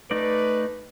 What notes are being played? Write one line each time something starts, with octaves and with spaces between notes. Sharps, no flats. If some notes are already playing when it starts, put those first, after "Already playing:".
A3 D#4 B4 D5